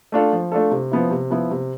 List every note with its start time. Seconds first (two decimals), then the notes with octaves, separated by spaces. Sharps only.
0.12 A3 D4 F4 A4
0.33 F3
0.52 A3 D4 F4 A4
0.71 C3
0.91 F3 B3 E4
1.11 C3
1.30 F3 B3 E4
1.51 C3